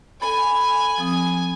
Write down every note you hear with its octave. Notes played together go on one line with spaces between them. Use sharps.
A4 G#5 B5
F3 C4 D#6